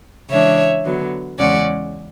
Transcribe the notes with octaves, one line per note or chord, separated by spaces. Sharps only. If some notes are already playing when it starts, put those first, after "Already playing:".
C#3 E3 G#3 D4 C#5 E5
D3 F#3 B3
E2 C#3 G#3 C#4 D5 F#5